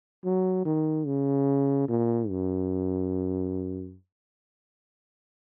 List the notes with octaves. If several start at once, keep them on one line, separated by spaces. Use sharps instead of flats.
F#3
D#3
C#3
A#2
F#2